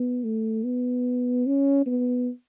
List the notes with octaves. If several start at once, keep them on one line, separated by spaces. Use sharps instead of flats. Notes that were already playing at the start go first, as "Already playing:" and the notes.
Already playing: B3
A3
B3
C#4
B3